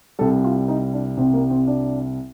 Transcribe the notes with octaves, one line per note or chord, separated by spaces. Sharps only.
C2 C3 G3 A4
F4
D#4
D4
C2 C3 G3 C4
A#3
C4
D4